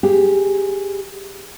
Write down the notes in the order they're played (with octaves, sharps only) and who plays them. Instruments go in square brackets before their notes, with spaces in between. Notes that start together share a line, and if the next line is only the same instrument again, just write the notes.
[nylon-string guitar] G4 G#4